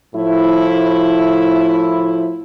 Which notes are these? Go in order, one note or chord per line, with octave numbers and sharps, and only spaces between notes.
A2 F3 E4